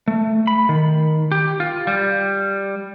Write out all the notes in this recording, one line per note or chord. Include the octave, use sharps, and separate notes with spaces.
A3
B5
D#3
G4
F4
G3